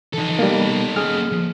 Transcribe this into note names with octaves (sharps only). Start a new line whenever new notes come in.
E3 F3 D#4 A4
G3 A#3 B3 D#5
A#3 C#4 G#4 F6
F3